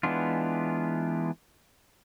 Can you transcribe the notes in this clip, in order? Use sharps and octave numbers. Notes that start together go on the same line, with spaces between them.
E3 G#3 B3 D4 F4